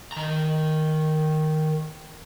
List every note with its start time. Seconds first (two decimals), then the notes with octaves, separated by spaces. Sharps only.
0.12 D#3 A#5